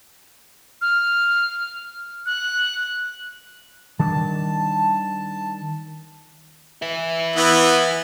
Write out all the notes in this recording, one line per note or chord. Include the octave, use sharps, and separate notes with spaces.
F6
F#6
D#3 G3 D4 A5
B4 E5
E3 B3